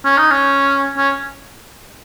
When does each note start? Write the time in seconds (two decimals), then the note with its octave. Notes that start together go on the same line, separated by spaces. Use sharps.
0.05 C#4
0.18 D#4
0.30 C#4
0.97 C#4